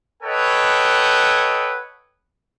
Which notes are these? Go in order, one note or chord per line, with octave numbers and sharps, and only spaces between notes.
A4 B4 C#5 D#5 F#5 G5